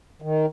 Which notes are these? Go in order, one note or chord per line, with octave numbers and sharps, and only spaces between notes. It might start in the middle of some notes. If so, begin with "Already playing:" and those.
D#3